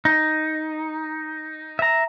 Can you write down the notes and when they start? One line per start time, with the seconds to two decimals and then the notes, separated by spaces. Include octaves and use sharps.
0.05 D#4
1.79 E5 A#5